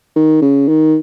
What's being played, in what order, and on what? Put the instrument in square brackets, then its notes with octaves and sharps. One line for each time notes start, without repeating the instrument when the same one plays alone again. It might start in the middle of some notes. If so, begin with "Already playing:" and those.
[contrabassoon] D#3
C#3
D#3